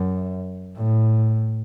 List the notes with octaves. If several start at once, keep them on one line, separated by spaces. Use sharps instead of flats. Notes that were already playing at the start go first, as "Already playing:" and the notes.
Already playing: F#2
A2